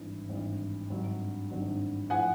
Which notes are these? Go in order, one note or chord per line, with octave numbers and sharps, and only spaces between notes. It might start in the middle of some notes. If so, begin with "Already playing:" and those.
Already playing: G#1 G2 E3
G#1 G2 E3
G#1 G2 D3 F#3
G#1 G2 D3 F#3
A2 F3 F#5 G#5